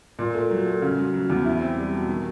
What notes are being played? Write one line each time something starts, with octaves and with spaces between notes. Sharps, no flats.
A#2
A3
F#3
A3
C#3
F#3
F#3
E2
E4
C4
G3
B2
D#3